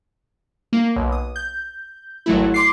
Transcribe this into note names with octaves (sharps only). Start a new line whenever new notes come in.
A#3
B1
D#6
G6
G#1 F#3 A3 E4
C6 D6 C7